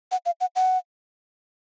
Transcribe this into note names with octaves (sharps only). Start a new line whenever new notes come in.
F#5
F5
F#5
F#5